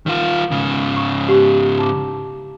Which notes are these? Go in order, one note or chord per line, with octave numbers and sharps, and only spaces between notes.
D#3 F4 A#4 B4
G#2 C#3
F#5 C#6
G4 F#5
D#4 E4 D6